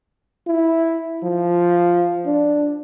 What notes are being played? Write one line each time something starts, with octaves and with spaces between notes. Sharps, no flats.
E4
F3
D4